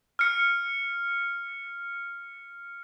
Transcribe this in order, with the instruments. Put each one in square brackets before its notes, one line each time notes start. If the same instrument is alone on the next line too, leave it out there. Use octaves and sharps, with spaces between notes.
[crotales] F6 C#7